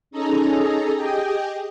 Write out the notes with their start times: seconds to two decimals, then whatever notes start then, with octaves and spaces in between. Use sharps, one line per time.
0.11 C#4 D#4 G#4 A4 A#5
0.95 G4 G#4 D#5 G5